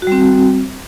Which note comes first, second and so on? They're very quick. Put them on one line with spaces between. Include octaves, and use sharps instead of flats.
F#4 G3 C4